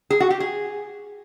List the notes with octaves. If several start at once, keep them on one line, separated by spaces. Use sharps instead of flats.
G#4
F#4
G4
G#4